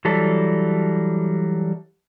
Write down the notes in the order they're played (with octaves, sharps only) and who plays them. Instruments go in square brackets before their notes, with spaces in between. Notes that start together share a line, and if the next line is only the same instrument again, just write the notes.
[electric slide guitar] E3 F#3 G3 A4